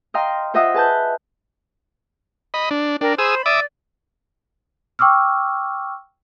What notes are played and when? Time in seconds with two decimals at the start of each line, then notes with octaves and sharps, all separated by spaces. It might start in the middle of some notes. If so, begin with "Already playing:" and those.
0.14 D#5 F5 G5 A#5 C6 F6
0.54 F4 C5 D#5 E5 F#5 D#6
0.74 G#4 B4 A5 F#6 G6
2.54 D#5 B5
2.71 D4
3.01 D4 A#4 G5
3.19 G#4 C5 B5 D#6 E6
3.46 D5 E5 D6 D#6
4.99 G5 C#6 D6 E6 F6